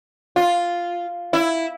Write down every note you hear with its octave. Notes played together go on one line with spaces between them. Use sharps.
F4
E4